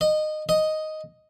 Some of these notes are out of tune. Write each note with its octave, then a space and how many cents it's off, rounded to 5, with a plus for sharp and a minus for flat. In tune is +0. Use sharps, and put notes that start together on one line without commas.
D#5 -20
D#5 +0